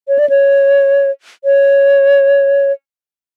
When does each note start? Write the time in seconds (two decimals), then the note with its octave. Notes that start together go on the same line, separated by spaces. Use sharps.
0.08 C#5
0.19 D5
0.29 C#5
1.44 C#5